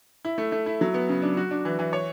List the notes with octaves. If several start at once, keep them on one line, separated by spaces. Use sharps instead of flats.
E4
A3
A3
E4
F#3
B3
C#3
D4
F#4
D4
E3
E3
C#5